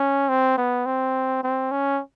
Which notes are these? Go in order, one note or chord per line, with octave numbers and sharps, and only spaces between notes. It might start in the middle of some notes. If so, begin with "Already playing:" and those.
Already playing: C#4
C4
B3
C4
C4
C#4